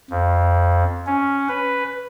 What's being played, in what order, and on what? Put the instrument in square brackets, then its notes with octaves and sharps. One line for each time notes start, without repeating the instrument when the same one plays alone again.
[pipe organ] F2
C#4
B4